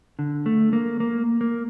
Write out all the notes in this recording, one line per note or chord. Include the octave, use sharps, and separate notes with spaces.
D3
A3
A#3
A#3
A#3